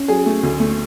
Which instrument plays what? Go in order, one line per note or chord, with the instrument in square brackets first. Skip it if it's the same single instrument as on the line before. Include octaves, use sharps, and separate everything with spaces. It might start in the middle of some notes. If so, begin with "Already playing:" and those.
Already playing: [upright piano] C#4
F#3 G#4
A3
D2
A3